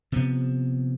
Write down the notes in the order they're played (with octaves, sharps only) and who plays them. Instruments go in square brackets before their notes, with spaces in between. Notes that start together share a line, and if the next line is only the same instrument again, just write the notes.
[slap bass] C3 F3 B3